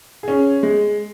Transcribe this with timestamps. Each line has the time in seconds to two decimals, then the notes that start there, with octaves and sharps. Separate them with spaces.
0.23 C#4 G#4
0.63 G#3